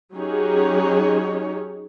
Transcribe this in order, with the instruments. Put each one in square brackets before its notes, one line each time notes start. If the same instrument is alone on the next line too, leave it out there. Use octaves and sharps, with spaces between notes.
[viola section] F#3 C#4 D#4 G4 G#4 C#5